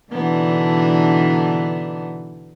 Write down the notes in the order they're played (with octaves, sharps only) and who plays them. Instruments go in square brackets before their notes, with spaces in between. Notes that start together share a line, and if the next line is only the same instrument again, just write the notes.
[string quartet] B2 D3 E3 B3 D4 D#4